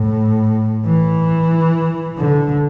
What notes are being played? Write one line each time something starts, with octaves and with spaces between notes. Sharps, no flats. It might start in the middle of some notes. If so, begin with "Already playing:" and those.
Already playing: A2
E3
D3